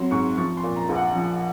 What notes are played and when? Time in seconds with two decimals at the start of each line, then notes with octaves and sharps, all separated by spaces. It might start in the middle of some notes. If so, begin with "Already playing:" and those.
Already playing: F#3 C4 C6
0.11 G#2 C#6
0.37 F3 C#6
0.57 C6
0.63 A#2
0.76 A#5
0.89 A#1
0.95 F#5
1.15 F3